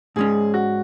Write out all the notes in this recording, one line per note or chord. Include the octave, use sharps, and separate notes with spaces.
G#2 G#3 C#4 G#4
F#4